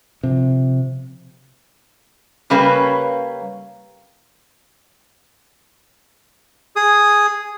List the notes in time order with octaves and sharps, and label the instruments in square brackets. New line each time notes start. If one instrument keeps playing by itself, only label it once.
[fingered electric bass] C3 F3
[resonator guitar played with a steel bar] C#3 G3 A#3 C#4 B4
[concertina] G#4 D#6